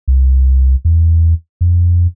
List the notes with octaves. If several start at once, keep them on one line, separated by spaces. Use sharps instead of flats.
C2
E2
F2